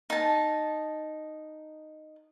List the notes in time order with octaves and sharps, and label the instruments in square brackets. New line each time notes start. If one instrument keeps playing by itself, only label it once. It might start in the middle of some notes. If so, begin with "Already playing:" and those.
[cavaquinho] D#4 A5